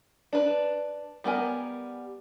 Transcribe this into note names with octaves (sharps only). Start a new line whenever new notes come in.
D4 B4
G3 B3 A#4 G#5